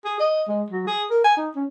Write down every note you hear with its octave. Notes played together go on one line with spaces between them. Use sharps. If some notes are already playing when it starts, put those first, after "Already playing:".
G#4
D#5
G#3
F#3
G#4
A#4
G#5
D#4
C#4